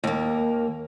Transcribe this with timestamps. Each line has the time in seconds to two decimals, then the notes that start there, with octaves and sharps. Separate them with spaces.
0.04 D#2 A#3